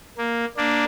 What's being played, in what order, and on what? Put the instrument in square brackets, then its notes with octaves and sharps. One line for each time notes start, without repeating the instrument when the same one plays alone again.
[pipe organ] A#3
A#3 D4